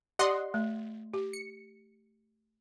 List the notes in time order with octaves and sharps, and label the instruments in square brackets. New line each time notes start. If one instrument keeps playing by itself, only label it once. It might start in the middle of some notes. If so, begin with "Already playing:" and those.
[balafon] G4 D5 [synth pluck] D#5 F#5 C6
[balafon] A3
G4
[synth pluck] C#7